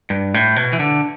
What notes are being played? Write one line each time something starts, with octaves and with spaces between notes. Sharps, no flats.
G2
A2
B2
E3
D3